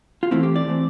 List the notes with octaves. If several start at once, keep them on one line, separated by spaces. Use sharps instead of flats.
F4
E3 A3 C4 E4
G4
D5
E3 A3 C4